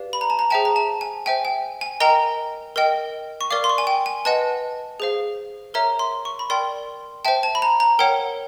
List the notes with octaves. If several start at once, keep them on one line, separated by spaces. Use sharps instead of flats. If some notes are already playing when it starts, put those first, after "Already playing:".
Already playing: G4 B4 D5 F5
B5
A#5
A5
A#5
G#4 C5 E5 G5 A5
A#5
A5
G#5
C5 E5 G5 G#5
G5
G#5
A#4 D#5 G5 A#5
A#4 D#5 G5
C#6
A#4 D5 F5 D6
C6
C#6
G#5
G5
G#5
B4 D#5 F#5 A5
G#4 C5 F5
A#4 C#5 E5 A#5
C6
C#6
B5
A#4 D5 G5 C6
C5 E5 G5 A5
A5
B5
A#5
A#5
A#4 C#5 F#5 G5